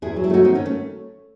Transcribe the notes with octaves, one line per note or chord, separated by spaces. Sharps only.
E2 E4 G#4
F#3
E4 G#4
A3 D#4 F#4
D#3 C4 D#4
A3 C#4
A3